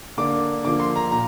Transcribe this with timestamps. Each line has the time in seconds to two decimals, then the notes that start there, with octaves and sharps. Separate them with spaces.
0.17 D3 A#3 D4 D6
0.64 D3 F3 A#3 D6
0.80 C6
0.96 A#5
1.11 A#2 A#5